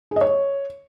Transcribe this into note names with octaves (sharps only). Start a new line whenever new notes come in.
G#4
D#5
C#5